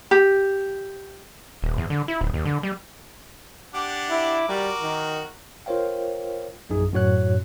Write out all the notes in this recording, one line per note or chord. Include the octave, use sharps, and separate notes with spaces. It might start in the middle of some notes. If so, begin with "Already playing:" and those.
G4
D#1
E2
D3
E4
D1
D#2
D3
G3
D4 G4 F#5 D6
E4
G3 F#4 A#4
D#3
F4 A#4 C5 C#5 F5 G5
A#1 F#2 D#4 G#4
F#2 A2 F#4 C#5 F#6